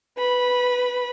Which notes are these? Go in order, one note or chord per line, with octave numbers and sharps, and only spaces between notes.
B4 B5